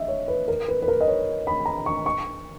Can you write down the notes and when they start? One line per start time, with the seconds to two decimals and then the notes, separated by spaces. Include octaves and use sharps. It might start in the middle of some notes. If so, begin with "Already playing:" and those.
Already playing: D#5 E5
0.08 C#5
0.28 B4
0.48 A#4
0.68 B4
0.82 B4
0.88 A#4
1.01 D#5
1.08 C#5
1.47 B5
1.66 A#5
1.86 C#6
2.06 C#6